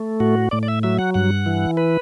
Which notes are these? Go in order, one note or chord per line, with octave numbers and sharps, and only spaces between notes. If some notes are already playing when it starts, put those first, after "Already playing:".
Already playing: A3
A2 F#4
A2 D5
D5
E5
F#3 E5
F#5
G2 F#5
E3
B4